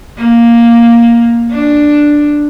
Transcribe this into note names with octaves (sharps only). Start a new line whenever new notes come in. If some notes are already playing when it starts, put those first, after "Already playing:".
A#3
D4